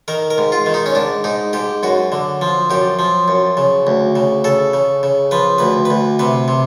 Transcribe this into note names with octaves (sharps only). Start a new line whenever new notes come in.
D#3 A#4
A#4
G#2
F4
D#3
D#4
C#4
G#2 D4
G#2 D#4
G#2 G4
F#2 F#4
D3
F3
F#2 G4
F3
F#2
C#3
D2
C#3
C#3 A4
C#3
C#3
F3 B4
D2 B4
D2 B4
C3 B4
C3